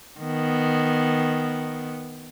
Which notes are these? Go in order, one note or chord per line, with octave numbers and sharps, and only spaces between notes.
D#3 B3